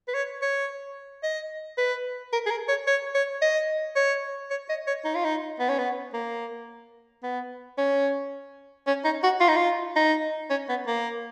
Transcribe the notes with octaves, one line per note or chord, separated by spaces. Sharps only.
B4
C#5
C#5
D#5
B4
A#4
G#4
A#4
C#5
C#5
C#5
D#5
C#5
C#5
D#5
C#5
D#4
F4
D#4
B3
C#4
B3
A#3
B3
C#4
C#4
D#4
F#4
F4
D#4
F4
D#4
C#4
B3
A#3